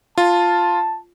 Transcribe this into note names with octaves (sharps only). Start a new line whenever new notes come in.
F4 A5